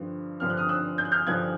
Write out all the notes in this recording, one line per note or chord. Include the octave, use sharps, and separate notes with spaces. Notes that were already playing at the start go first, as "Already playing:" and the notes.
Already playing: G2 D3 F3
G2 D3 F3 F6
F#6
D#6 F6
E6 F#6
G6
F#6
F6 G6
G2 D3 F3 F#6 G#6